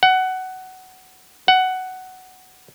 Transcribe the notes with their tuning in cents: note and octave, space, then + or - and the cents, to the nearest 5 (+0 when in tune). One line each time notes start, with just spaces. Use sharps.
F#5 +15
F#5 +10